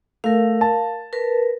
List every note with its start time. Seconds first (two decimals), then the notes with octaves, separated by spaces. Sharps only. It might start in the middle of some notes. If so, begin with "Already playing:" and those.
0.24 A3 A#4 F5
0.61 A5
1.13 A#4 B4